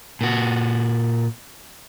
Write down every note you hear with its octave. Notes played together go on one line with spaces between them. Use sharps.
A#2 F#4